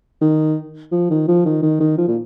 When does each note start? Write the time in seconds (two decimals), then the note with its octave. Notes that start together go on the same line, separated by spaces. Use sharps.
0.21 D#3
0.92 F3
1.10 D#3
1.28 F3
1.45 D#3
1.62 D#3
1.80 D#3
1.98 F3
2.08 A#2